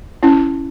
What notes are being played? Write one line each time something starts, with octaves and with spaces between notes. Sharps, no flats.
C#4 E4